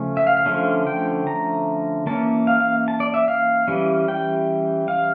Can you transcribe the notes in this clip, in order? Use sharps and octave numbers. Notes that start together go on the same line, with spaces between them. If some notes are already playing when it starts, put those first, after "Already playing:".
Already playing: C#3 F3 A3 C#4
E5
F5
F5
D3 F3 A3 C#4
G5
A#5
E3 A#3 C#4 A5
F5
F5
A5
D5
E5
F5
E3 G3 C#4
G5
F5